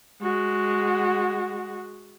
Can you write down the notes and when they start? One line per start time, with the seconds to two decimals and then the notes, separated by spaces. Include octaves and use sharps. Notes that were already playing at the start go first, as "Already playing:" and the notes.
0.22 G#3 F#4